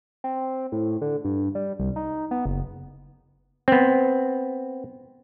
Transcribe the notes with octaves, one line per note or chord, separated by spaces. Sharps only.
C4
A2
D3
G2
G3
C2
D#4
B3
F#1
B3 C4